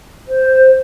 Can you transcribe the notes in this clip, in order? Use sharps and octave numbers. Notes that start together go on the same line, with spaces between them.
C5